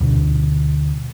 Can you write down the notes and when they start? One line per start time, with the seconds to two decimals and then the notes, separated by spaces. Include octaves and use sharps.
0.01 D2 B2 D3